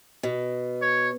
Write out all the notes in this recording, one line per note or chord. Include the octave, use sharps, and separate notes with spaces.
B2
C#5